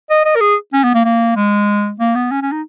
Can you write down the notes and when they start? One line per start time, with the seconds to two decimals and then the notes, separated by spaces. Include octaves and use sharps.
0.10 D#5
0.25 D#5
0.36 A#4
0.41 G#4
0.73 C#4
0.84 B3
0.94 A#3
1.05 A#3
1.36 G#3
1.99 A#3
2.15 B3
2.31 C#4
2.42 C#4
2.52 D#4